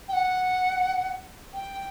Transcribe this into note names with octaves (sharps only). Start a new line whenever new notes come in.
G5
F#5
G5